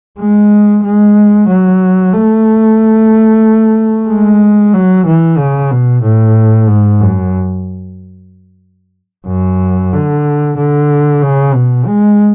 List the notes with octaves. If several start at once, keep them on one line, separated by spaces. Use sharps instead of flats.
G#3
G#3
F#3
A3
G#3
F#3
E3
C#3
B2
A2
G#2
F#2
F#2
D3
D3
C#3
B2
G#3